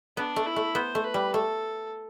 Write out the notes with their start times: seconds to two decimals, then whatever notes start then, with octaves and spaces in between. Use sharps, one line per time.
0.17 B3 D4
0.36 A3
0.46 E4
0.56 A3
0.75 B3 C5
0.95 A3
1.04 B4
1.14 G3
1.34 A3 A4